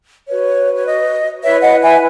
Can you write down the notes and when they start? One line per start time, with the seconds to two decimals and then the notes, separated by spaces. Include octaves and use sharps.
0.27 F#4 B4 C#5
0.75 C#5
0.86 D#5
1.43 E4 B4 C#5 E5
1.63 D#5 F#5
1.82 E5 G#5